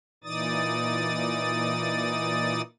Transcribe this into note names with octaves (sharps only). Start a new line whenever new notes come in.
A#2 E3 D#4 D5 D#6 A6